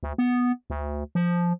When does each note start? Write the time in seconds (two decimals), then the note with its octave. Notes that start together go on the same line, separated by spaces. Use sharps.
0.03 D2
0.18 B3
0.70 D2
1.15 F3